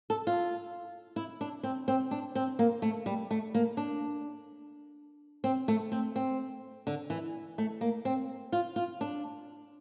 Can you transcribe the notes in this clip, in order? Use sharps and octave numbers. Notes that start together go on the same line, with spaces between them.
A4
F4
E4
D4
C4
C4
D4
C4
A#3
A3
G3
A3
A#3
D4
C4
A3
C4
C4
D3
E3
A3
A#3
C4
F4
F4
D4